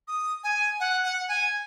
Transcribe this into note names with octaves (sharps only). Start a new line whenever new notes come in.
D#6
G#5
F#5
F#5
G#5